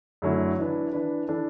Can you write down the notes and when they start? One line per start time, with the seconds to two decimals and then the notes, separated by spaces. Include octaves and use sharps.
0.22 F#2 D3 F#3 A3 E4
0.57 E3 D4 B4
0.93 E3 D4 B4
1.28 E3 D4 A4